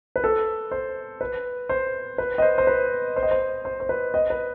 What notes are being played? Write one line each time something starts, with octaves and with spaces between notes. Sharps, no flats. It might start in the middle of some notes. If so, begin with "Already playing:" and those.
B4
A4
C5
B4
C5
B4
D#5
C5
C5
B4
C5
D#5
C5
C5
C5
B4
D#5
B4